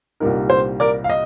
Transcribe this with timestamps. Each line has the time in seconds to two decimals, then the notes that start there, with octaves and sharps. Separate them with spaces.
0.20 C2 A#2 G3 A#3 D#4 A#4
0.50 C5
0.80 A#4 D5
1.04 F5
1.10 D#5